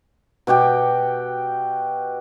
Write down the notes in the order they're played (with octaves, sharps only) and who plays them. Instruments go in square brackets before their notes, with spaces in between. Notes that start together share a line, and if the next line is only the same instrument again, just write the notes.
[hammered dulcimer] B2 F#4 G4 G5